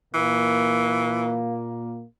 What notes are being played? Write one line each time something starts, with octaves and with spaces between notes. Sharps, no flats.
A#2 E3 A#3